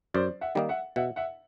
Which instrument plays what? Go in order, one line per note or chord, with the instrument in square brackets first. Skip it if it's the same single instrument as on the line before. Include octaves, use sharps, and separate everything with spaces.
[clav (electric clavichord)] F#2 [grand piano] C5 D5
[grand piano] E5 F#5
[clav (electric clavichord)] D#3 G3 A#3 D#4
[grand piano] E5 F#5
[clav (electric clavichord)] B2 [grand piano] E5 F#5
[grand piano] E5 F#5